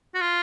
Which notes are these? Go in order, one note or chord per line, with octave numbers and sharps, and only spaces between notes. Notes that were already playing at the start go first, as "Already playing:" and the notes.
F#4
F4